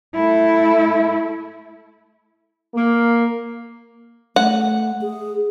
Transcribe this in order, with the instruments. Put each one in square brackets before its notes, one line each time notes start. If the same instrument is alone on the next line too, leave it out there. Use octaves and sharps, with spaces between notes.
[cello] A3 E4
[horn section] A#3
[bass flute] A3 [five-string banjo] F#5
[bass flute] G#4